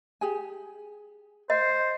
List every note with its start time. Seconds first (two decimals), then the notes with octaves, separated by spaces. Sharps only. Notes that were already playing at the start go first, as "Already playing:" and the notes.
0.21 G4 G#4 G#5
1.50 C5 D#5